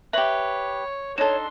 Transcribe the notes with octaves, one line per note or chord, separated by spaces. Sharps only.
G4 B4 C#5 E5 F#7
D4 D#4 A4 C#5 C6 E7